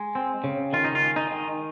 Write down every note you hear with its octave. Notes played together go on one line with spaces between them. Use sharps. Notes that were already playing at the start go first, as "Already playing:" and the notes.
Already playing: G#3
C4
C#3
D#3 F4
D#4
F4
G#3
D#4
D#3